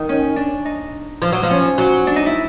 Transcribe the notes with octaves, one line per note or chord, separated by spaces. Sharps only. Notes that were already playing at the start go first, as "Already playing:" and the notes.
Already playing: D#3 D#4
C#4
D4
D#4
F3
F#3
F3
C#4
F#3
D4
D#4
E4